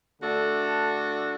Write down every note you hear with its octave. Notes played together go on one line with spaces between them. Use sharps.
D3 A3 D4 F#4 A4